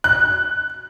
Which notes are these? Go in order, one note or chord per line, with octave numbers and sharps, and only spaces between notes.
F#6